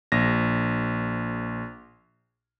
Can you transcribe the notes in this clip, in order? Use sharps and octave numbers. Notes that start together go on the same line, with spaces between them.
A#1 A#6